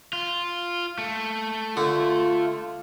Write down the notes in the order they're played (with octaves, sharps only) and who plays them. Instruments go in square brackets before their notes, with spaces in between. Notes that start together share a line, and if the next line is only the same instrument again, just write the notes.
[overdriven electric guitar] F4
A3
[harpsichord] D3 [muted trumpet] F4